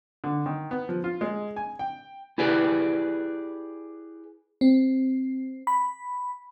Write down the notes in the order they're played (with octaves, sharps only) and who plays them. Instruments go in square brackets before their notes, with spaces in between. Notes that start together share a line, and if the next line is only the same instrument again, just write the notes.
[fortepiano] D3
D#3
B3
F3
F4
G#3
G#5
G5
[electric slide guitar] E4 G4 G#4 B4 D5
[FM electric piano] C4
B5